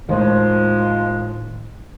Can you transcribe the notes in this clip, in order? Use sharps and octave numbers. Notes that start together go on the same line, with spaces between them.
D#2 A2 D#3 F3 G#3